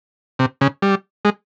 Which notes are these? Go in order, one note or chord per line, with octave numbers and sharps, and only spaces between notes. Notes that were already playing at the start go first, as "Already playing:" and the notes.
C3
C#3
G3
G#3